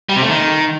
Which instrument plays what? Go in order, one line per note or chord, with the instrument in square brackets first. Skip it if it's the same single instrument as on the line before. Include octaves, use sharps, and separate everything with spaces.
[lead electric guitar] G3
C3
A3
D#3